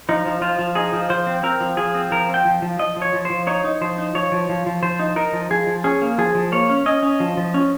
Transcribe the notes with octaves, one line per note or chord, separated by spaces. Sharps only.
F3 D#4
F3
F3 F4
F3
D#4 G#4
F3
F3 C5
C4
C4 A#4
F3
F3 G#4
C4
F3 A#4
C4
G5
F3
F3
F3 D#5
F3
C#5
F3
F3 C5
D#4 C#5
D#4
F3 C5
D#4
F3 C#5
F3
F3
F3
F3 C5
D#4
D#4 A#4
F3
F3 G#4
F3
C#4 G#4
A#3
F3 G#4
F3
A#3 C#5
C#4
C#4 D#5
C#4
F3
F3
C#4